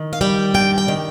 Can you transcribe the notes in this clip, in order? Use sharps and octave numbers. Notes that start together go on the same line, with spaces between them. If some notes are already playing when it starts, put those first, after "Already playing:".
Already playing: D#3
F5
G3 G5
G2 G5
G5
D#3